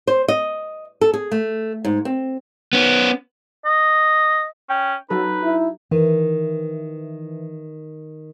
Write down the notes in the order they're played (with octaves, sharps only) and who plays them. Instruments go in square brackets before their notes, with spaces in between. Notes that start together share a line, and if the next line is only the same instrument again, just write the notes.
[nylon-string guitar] C5
D#5
A4
G#4
A3
G#2
C4
[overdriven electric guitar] B3 C#4
[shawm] D#5
[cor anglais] C#4 [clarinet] G5
[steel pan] F#3 A4 [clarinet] D#4 [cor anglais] B4
[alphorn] E4
[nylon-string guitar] D#3 [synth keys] E3